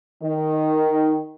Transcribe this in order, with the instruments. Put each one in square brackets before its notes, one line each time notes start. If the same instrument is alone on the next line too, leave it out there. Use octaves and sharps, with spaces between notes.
[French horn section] D#3